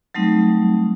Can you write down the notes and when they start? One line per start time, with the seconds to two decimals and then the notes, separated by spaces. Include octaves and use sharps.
0.14 F#3 G3 A3 C4 D#4